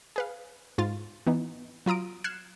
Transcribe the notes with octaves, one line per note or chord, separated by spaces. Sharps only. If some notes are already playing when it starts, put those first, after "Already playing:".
G#4 B4 F5
G#2 F4 A6
E3 B3 D#4
F#3 F4 A#5 D#6 D7
F6 F#6 G#6 C7 C#7 E7